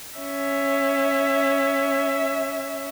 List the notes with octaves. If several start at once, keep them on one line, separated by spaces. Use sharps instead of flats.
C#4 E5